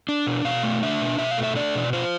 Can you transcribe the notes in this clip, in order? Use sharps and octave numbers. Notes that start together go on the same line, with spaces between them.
D4
B2
B2 F5
A3
D4 E5
B2
B2 E5
F5
A3
E5
D4 D5
B2
F4 C5